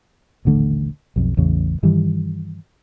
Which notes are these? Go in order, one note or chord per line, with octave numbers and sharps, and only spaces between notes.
D#1 A1 D3 A3
B1 F2
A1 E2 C#3 C#4
G2 D#3 E3 G3